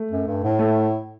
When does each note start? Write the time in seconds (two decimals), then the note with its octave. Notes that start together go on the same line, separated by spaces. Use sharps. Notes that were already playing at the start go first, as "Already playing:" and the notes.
Already playing: A3
0.11 F#2
0.27 G2
0.44 A2
0.59 A3